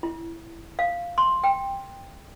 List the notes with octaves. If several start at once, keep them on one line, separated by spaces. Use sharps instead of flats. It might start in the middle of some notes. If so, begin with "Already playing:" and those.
E4
F5
C6
G5